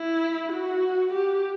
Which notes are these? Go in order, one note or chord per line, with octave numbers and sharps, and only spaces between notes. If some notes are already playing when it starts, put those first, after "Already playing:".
Already playing: E4
F#4
G4